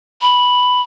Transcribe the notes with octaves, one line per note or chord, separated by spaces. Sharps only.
B5